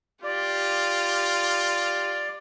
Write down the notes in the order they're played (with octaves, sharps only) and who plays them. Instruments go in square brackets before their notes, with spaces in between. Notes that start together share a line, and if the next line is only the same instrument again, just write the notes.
[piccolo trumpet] F4 [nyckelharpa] G4 [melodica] D5